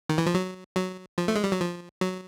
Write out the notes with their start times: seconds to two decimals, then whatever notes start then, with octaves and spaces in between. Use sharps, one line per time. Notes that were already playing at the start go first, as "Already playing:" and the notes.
0.09 D#3
0.18 E3
0.26 F3
0.34 F#3
0.76 F#3
1.18 F3
1.28 A3
1.36 G#3
1.44 G3
1.52 F#3
1.60 F3
2.01 F#3